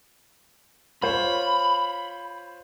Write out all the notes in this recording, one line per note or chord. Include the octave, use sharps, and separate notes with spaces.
F4 C5 C#5 B5